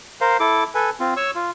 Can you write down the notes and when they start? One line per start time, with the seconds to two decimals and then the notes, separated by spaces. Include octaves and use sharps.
0.21 A#4 C5 F5
0.40 E4 A4 D6
0.75 A4 B4 G#5
1.00 C4 F4
1.17 C#5 C#6 E6
1.35 F4